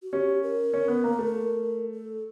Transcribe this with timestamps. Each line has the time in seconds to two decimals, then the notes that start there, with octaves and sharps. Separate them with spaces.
0.02 F#4
0.12 C#4 G4
0.43 A#4
0.73 C#4
0.88 B3
1.04 A#3
1.19 A3
1.94 A4